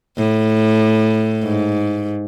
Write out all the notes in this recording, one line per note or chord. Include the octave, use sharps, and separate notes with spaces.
A2
G#2